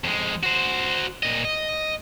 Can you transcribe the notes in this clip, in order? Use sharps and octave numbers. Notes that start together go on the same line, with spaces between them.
F2 G#3
F#4 C5
A#2 D#5
D#5